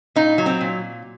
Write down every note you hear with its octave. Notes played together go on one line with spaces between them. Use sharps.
A#2 D#4
F#3
C4
A#2